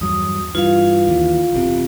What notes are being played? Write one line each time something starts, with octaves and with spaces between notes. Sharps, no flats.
E2 G2 F#3 D#6
G2 E3 F4 F5
D#2 E3
F#1 E2 C3